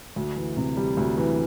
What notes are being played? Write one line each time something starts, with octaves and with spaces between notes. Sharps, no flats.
D2
E3
C3
G3
D2
E3